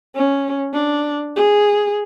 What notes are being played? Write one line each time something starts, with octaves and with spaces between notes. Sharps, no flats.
C#4
D4
G#4